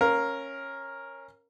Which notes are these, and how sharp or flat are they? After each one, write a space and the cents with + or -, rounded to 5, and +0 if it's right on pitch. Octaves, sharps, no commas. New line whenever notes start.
C#4 -15 A#4 +5 F5 +10